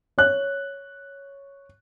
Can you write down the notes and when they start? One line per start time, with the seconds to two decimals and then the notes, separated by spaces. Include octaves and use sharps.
0.18 C#5 F#6